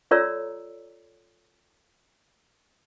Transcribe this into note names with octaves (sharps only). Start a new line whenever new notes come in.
F4 A4 C#5 D5 A#5 E6